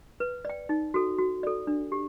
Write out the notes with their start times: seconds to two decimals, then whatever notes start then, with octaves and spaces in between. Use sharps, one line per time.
0.20 B4
0.45 D5 G5
0.69 D#4
0.94 F#4 A4
1.19 F#4
1.43 A4 D5
1.67 D4
1.92 G4